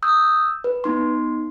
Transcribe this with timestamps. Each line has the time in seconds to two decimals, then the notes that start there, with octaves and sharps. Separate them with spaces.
0.03 D#6 E6 G6
0.64 B4
0.84 B3 D#4 C6